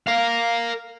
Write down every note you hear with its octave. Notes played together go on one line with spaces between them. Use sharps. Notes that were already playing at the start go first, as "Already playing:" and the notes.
A#4 F5